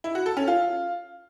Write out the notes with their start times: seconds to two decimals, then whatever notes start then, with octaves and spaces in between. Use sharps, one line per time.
0.04 E4
0.15 F#4
0.26 A4
0.37 C#4
0.48 F4